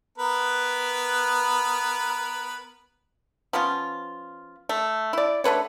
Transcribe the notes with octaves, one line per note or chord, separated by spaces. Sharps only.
B3 A#4 B4
F3 B3 C#4 F4
A3
E4 D5
D3 A3 B4 C#5